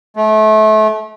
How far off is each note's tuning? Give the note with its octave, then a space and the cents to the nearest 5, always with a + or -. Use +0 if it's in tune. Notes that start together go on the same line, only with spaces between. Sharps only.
A3 -30